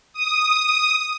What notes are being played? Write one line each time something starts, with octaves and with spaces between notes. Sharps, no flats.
D#6